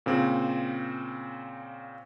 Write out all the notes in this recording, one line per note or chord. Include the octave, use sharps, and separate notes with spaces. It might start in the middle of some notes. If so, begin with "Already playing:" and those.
A#2 C#3 C4